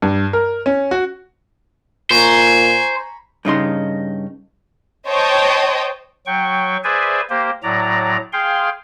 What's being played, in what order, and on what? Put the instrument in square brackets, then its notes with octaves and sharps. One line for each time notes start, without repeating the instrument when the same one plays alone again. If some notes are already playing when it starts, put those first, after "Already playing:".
[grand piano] G2
A#4
C#4
F#4
[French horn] A#2 [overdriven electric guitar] C5 [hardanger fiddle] G#5 [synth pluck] A#5 B5 C#6
[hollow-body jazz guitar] G2 C#3 D#4 C6
[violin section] C5 C#5 D#5 G5 A5
[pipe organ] F#3 G5 C#6
G#4 B4 C5 D5 E5 G#5
A#3 G4 C5
A2 F#3 D5 A#5
G#4 F5 G5 C6